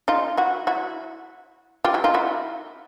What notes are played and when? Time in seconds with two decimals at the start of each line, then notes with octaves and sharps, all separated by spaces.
0.08 D#4 F4
0.38 E4 F#4
0.67 E4 F#4
1.85 F4 G4
1.94 E4 F#4
2.04 D#4 F4
2.14 E4 F#4